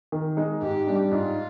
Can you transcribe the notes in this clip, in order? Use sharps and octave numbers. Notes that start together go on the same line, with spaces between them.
D#3
G#3 D#4
G#2 G4
G3 D4
G#2 F4